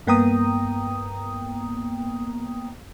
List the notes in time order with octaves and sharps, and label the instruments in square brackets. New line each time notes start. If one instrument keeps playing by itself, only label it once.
[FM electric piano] G2 A#3 B3 G5 A#5 D#6